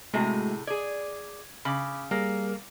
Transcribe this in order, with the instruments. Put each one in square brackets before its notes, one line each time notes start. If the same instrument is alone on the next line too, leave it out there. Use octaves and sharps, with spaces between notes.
[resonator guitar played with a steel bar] A2 C3 G#4 [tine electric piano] G#3 A3 F#4
[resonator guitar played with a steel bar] G#4 D5 [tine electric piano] G#6
[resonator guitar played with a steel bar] C#3 [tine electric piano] B5 D6
[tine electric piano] G3 G#4 [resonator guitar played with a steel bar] A#3